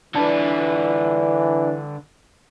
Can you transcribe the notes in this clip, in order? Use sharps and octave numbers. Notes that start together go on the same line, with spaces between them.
D3 E3 D4 B4